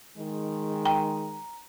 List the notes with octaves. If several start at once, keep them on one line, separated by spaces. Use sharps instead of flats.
D#3 G#3
G5 A#5